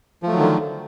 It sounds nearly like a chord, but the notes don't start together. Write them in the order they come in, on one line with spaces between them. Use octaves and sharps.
F3 A3 F#3 D#3 D3